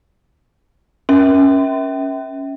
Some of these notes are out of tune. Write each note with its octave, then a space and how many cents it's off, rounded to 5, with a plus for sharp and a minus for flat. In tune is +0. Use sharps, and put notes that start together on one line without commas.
C#4 +0 E5 -20